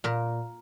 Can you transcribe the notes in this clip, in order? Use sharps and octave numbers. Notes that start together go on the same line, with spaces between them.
A#2 A#4